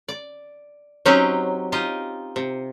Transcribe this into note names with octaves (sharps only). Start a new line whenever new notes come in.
D5
F#3 C4 C#4 D#4 G4
D#4 F4 G4 D#5
C3